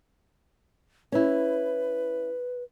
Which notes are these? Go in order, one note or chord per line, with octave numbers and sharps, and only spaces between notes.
C#4 E4 B4